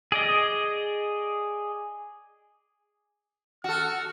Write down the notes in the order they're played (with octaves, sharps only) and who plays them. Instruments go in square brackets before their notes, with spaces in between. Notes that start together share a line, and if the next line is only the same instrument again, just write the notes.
[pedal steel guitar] G#4 D5 D#5
[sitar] F#4 A4 [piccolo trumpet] F6